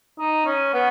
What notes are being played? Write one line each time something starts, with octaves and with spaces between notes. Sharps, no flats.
D#4
C#4
B3